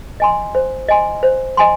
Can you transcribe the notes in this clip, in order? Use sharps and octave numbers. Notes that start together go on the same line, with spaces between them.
D#5 G#5 C6
C5
D#5 G#5 C6
C5
D#5 G#5 C6